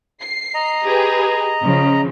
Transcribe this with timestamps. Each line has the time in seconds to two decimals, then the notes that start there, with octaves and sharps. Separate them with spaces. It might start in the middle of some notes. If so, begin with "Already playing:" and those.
0.22 C7
0.54 D#5 A#5
0.84 G4 G#4 B4
1.63 C#3 F3